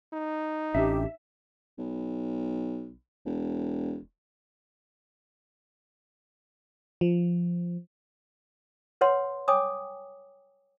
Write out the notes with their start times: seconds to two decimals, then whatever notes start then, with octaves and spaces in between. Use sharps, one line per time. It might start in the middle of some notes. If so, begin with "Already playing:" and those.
0.13 D#4
0.74 A1 C#4 D4 G4 E5
1.79 B1
3.26 E1
7.01 F3
9.01 B4 C#5 F#5 C6
9.48 C#5 G5 G#5 D6 D#6